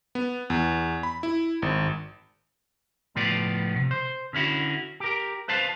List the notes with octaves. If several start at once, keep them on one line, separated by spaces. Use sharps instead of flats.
B3
E2
B5
E4
G#1
C#2 A2 F3 B3 D5
C3
C5
D3 C#4 E4 F#4
G4 A#4
B4 C5 F5 A5